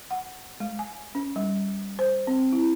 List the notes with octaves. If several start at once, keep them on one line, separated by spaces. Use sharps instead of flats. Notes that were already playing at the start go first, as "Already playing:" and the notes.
F#5
G#3
G#5
C#4
G3
C5
C4
E4